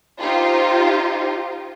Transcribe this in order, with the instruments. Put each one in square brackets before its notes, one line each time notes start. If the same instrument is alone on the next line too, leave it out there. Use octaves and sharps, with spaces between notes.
[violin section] D#4 F4 G4 C5